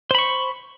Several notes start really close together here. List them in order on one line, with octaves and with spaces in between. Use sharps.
C5 B5 C#6